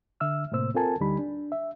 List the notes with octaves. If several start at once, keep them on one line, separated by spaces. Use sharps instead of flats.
D3 E5 E6 F6
A2 C3 A#3 C5 E6
C4 F4 A4 A#4 G#5 A5
D2 D3 G3 D#4 G4 B5
D4
E5